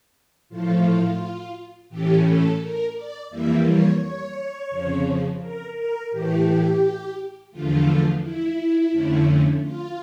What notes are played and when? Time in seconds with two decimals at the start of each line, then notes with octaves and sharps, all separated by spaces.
0.49 A2 F3 A3 F4
1.89 A2 E3 A3 C#4 G4
2.25 A4
2.59 A#4
2.94 D5
3.30 F2 E3 G3 A#3 E5
3.65 C#5
4.00 C#5
4.70 F2 C#3 F3
5.41 A#4
5.76 A#4
6.11 A2 E3 A3 G4
7.51 E2 D3 F3 A3 F4
8.22 E4
8.92 F2 D3 A3 C#4
9.63 F4